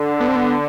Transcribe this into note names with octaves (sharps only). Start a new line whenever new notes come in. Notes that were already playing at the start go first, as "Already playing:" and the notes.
Already playing: D3
B3
C4
B3